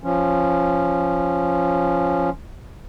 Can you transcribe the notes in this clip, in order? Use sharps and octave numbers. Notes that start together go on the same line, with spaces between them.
F3 C#4